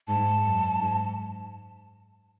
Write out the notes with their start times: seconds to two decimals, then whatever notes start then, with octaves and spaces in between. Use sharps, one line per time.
0.08 G#2 A5
0.45 F#2
0.82 G#2